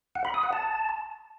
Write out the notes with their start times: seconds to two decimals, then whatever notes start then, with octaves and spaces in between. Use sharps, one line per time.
0.15 F#5
0.25 B5
0.34 D#6
0.43 F#5
0.53 A5